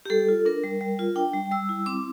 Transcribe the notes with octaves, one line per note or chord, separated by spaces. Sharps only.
G4
G3 A4
F4
D4 A#4
G3
G3
F4
D4 G5
G3
G3 E6
E4
C4 D6